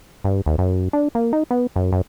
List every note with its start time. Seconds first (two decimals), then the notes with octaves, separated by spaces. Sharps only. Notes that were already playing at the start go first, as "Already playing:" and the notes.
0.24 G2
0.46 D#2
0.58 F#2
0.93 D4
1.15 A#3
1.33 D#4
1.51 B3
1.76 F#2
1.92 F#2